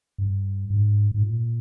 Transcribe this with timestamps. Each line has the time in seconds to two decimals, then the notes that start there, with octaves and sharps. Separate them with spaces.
0.18 G2
0.70 G#2
1.11 G#2
1.22 A#2